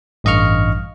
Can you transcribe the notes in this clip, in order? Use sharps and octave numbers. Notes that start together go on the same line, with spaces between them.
A1 G2 D#5 F5 C#6 F6